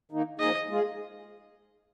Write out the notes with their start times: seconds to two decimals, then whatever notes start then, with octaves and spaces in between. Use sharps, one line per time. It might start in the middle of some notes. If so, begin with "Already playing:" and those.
0.11 D#3 A#3 D#4
0.40 F3 A#3 D#4 G#4 D#5
0.69 G#3 F4 G#4